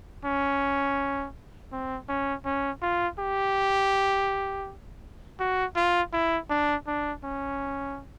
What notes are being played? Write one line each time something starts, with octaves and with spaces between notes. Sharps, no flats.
C#4
C4
C#4
C#4
F4
G4
F#4
F4
E4
D4
D4
C#4